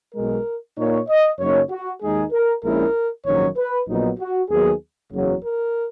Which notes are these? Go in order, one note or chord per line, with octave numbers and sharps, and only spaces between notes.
B1 B2 G#3 A#4
A#2 A#3 D#4 C#5
D#5
F#2 C#3 F#3 A#3 D#4 C#5
F#4
D#2 D#3 G#3 D#4 G#4
A#4
A#1 A#2 G#3 C#4 E4 A#4
A#1 G#2 D#3 F#3 C#4 C#5
B4
A#1 A#2 F#3 B3 D#4
F#4
D#2 D#3 F#3 B3 G#4
F#1 E2 C#3 F#3
A#4